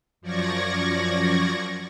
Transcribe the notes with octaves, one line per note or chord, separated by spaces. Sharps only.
F#2 F3 D5 C#6 G#6 A#6